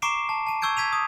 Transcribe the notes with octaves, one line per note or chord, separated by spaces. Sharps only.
A#5 C#6 D6 C7 D7 E7
A5
A5 D#7
C#6 E6 G6 G#6 D7
G#6 B6 D#7 F7
D#6